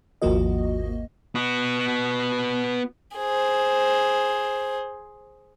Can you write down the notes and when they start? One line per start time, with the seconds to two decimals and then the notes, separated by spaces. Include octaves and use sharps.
0.22 G#1 D#2 F3 A#3 F#4 D#5
1.35 B3 F#4
3.16 G#4 C5